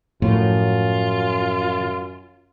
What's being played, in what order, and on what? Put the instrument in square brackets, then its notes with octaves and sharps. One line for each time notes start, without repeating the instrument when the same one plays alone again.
[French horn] F#2 [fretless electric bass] A2 [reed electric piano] F3 [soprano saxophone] F4